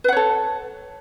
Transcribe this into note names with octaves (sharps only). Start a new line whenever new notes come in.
A4 B4 C#5 F#5